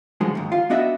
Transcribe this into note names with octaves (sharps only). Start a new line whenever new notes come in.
D3 F3 F#3 G#3
D#2 G#2
F4 F5
B3 D4 F#4 D#5 E5